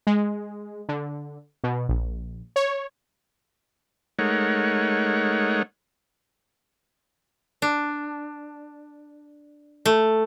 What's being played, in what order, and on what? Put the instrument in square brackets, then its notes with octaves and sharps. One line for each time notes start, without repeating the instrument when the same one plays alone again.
[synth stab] G#3
D3
B2
A#1
C#5
[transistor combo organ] G#3 A3 D#4 A#4 C#5 F#5
[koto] D4
A3